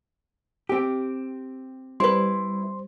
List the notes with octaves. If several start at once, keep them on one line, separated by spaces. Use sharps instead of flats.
C4 G4
G3 E4 B4 C5 C6